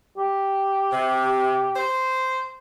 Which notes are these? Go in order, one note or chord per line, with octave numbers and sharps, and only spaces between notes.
G4
C3
C5